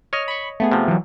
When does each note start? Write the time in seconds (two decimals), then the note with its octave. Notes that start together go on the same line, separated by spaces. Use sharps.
0.13 C#5 D#5 F6
0.28 B5 C#6
0.60 A3 B3 G#4
0.72 C3 F3
0.88 E3 F#3